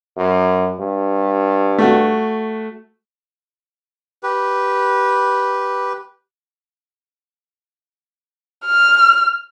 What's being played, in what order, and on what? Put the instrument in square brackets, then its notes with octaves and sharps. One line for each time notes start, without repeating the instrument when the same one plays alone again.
[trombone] F#2
G2
[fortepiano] A3 F#4
[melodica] G4 B4
[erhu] F6